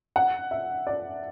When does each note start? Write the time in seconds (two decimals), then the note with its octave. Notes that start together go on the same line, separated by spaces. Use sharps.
0.16 F#5
0.51 E5
0.87 D5